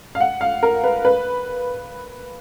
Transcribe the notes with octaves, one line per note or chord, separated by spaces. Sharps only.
F5
F#5
F5
A#4
B4
B4